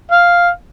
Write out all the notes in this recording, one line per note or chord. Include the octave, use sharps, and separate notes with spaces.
F5